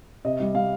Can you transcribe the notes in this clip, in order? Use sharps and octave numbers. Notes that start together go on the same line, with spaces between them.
C3 D#5
G3
G3 F5